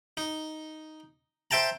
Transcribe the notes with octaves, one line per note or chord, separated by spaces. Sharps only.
D#4
C5 E5 G5 A5 A#5